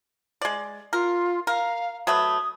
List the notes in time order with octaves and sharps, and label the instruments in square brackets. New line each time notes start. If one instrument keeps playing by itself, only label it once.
[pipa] G#3 D5
[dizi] F4 [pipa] A#4
[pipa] A#4 [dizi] F5
[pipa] F#3 A3 B4 [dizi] D#6